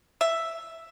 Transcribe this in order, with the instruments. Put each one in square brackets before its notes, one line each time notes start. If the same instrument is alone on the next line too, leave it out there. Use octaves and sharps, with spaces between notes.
[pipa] E5